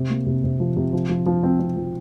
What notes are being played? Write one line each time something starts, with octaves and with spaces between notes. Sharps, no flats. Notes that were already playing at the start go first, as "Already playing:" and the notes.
Already playing: C3
A#3
C3
C3
F3
C3
F3
F3
F3
C4
C4
F3